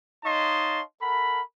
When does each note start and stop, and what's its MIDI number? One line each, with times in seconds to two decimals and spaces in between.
0.24 0.82 63
0.24 0.82 73
0.24 0.82 75
0.24 0.82 77
0.24 0.82 81
0.24 0.82 84
1.01 1.41 69
1.01 1.41 70
1.01 1.41 78
1.01 1.41 83